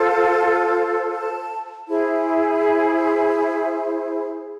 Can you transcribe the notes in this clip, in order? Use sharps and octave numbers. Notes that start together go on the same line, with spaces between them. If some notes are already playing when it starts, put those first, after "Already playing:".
Already playing: F4 A4 C5
A5
E4 G#4 C5